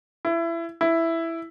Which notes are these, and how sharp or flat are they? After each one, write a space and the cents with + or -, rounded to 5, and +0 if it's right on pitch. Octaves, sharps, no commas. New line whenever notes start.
E4 +25
E4 +5